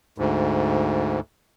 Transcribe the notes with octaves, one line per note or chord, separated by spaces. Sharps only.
D2 G#2